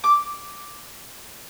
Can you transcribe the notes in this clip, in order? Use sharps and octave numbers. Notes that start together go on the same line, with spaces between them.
D6